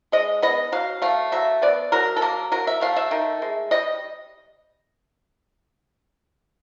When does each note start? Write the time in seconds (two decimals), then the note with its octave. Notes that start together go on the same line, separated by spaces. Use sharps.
0.12 G#3 D#5
0.42 B3 D#5
0.72 F#3 F5
1.02 A3 F5
1.32 F#3 E5
1.62 B3 D5
1.92 F#3 A#4
2.16 A4
2.21 A#3 A#4
2.52 F#3 A#4
2.67 E5
2.81 A3 F5
2.96 E5
3.11 D#3
3.42 G#3
3.71 G3 D#5